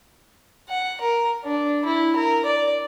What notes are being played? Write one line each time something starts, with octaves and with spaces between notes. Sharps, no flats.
F#5
A#4
D4
E4
A#4
D5